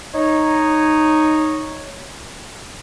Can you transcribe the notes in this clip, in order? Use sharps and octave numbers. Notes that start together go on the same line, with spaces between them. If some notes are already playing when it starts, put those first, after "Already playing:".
D#4 C#5